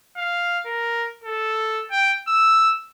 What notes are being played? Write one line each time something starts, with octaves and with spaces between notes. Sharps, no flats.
F5
A#4
A4
G5
E6